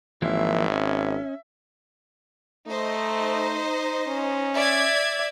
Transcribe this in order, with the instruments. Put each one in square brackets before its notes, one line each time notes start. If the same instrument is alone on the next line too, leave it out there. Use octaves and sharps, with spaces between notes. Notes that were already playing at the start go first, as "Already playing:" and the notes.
[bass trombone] G#1 [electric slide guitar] E3 F3 A#3 [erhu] E5
[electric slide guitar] C#4 [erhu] E5
[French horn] A3 [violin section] D#4 C5 D#5
[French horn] C#4
[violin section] D5 E5 G#6